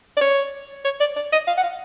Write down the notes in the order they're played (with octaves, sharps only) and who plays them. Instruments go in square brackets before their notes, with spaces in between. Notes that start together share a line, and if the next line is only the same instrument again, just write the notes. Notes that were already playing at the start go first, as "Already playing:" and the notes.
[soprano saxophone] D5
C#5
C#5
D5
D5
D#5
F5
F#5
F5